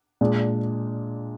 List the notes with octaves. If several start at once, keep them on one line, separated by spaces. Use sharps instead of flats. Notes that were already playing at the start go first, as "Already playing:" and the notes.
A#2 G#3 D4